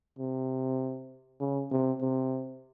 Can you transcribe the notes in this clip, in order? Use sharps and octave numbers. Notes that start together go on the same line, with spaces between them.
C3
C#3
C3
C3